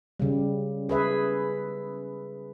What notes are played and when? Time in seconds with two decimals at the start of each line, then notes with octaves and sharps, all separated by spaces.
0.20 C#3 G3
0.89 G#4 B4 E5